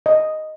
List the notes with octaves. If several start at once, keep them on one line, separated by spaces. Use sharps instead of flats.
D#5